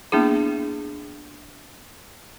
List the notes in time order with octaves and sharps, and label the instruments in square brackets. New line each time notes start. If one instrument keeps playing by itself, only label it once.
[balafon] A#3 B3 D4 E4 G#4